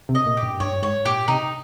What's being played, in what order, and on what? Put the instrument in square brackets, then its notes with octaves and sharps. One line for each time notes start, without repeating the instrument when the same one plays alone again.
[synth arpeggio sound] C3
[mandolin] D#5
[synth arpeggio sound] A#2
[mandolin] G4
[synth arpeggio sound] G2
[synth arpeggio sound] G2 [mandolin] C#5
[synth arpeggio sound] G#2 [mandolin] C#5
[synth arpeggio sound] A#2 [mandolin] G4
[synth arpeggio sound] C3 [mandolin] D#4